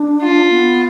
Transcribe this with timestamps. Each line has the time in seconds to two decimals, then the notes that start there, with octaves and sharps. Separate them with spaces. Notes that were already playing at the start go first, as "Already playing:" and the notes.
Already playing: D4
0.22 F4
0.50 B3